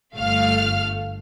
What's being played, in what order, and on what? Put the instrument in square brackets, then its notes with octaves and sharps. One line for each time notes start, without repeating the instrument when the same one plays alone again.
[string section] G1 A3 F5 F6